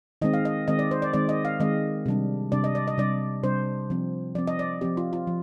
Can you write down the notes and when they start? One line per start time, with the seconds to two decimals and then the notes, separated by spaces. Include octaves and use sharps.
0.22 D#3 G#3 C4 D#5
0.34 F5
0.45 D#5
0.68 D#3 G#3 C4 D#5
0.79 D5
0.91 C5
1.02 D5
1.14 D#3 G#3 C4 D5
1.29 D#5
1.45 F5
1.60 D#3 G#3 C4 D#5
2.06 C3 G3 D4
2.52 C3 G3 D4 D5
2.64 D#5
2.75 D5
2.88 D#5
2.98 C3 G3 D4 D5
3.43 C3 G3 D4 C5
3.90 F3 C4
4.35 F3 D5
4.38 C4
4.47 D#5
4.59 D5
4.81 F3 C4 G4
4.97 F4
5.13 F4
5.27 F3